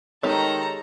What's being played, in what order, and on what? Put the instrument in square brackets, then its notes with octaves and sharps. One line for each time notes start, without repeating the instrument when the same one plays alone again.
[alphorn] D#3 [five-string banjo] G#3 D#4 G4 [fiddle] A4 A#5 [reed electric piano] C#5